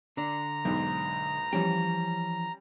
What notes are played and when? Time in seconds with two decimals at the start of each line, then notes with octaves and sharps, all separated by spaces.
0.17 D3 D4 A#5
0.65 B1 G#2
1.53 E3 F3 G3 C#4 G5